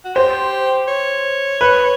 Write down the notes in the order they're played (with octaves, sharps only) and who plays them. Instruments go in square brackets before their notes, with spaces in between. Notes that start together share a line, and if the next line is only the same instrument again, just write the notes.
[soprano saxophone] F#4
[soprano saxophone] G4 [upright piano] C5
[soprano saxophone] C#5
[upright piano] B4